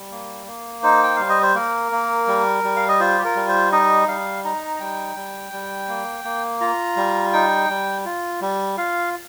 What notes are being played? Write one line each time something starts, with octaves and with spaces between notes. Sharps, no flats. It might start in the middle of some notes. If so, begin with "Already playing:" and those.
Already playing: G3
A#3
A#3
D#4 C5
G5
G3 F5
D#5
C5
A#3 A#4
A#3
G3
G3
F5
D#5
F4 C5
G4
A#4
G3
C5
D#4 D#5
G3 F5
D#4 A#5
A#5
G3 G5
G3
G3
A#3
A#3
F4 A#5
G3
D#4 G5
G3
F4
G3
F4 F5